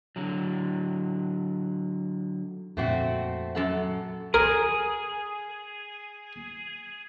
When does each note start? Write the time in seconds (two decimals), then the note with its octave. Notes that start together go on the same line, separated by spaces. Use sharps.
0.16 D3 F#3
2.77 F2 A#2 A3 C4 F#4
3.55 F#2 A4 F#5
4.34 G#4 A#4